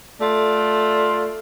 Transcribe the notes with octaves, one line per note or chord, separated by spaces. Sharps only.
A3 F4 D5